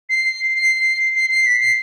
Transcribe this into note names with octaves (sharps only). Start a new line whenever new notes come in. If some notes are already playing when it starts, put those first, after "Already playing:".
C7
C7
C7
C7
B6
C7